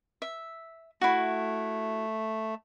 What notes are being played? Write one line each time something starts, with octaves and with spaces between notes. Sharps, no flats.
E5
A3 E4 F#4